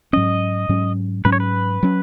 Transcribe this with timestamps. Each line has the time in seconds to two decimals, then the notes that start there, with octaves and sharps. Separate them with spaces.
0.13 G#2 F#3 C#4 D#5
0.69 G#2 F#3 C#4
1.25 G#2 F#3 C#4 B4
1.32 C#5
1.40 B4
1.83 F#3 C#4